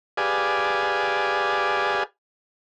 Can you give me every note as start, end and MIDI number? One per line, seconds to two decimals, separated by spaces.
0.17 2.03 67
0.17 2.03 68
0.17 2.03 71
0.17 2.03 74
0.17 2.03 77
0.17 2.03 80